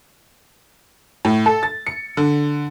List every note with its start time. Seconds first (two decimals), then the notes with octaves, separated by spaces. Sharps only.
1.25 A2
1.46 A4
1.63 A6
1.87 C#7
2.17 D3